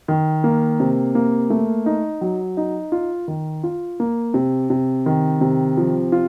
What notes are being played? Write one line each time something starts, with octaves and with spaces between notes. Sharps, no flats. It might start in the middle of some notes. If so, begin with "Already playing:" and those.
D#3
A#3
C3
A#3
A3
D#4
F#3
D#4
F4
D#3
F4
A#3
C3
C3
D#3
C3
F3
F4